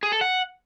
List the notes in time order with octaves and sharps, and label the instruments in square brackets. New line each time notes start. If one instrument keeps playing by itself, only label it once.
[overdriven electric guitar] G#4
A4
F#5